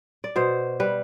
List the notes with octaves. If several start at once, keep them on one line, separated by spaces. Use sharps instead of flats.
D5
B2 C5
G3 B4